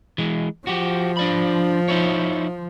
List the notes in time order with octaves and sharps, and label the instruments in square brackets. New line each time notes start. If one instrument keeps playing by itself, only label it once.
[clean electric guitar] E3 G#3
[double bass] F3 [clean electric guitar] F#4 G4
[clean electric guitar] D4 D5 B5
D#4 E4 C#5